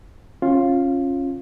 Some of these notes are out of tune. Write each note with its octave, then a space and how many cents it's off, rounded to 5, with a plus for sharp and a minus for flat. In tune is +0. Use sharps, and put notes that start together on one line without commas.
C#4 -25 F4 +0